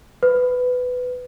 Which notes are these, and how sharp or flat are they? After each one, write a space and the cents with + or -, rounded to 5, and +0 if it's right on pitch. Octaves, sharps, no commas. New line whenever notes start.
B4 +15